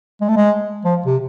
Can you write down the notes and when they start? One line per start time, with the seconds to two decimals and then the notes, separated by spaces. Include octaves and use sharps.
0.21 G#3
0.28 A3
0.36 G#3
0.85 F3
1.06 C3